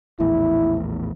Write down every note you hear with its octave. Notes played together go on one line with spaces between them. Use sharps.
A#1 E2 A2 E4